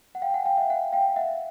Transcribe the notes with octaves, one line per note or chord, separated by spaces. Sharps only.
F#5
F5 G5
F#5 G#5
F5 G5
E5 F#5
E5 F#5
F5 G5
E5 F#5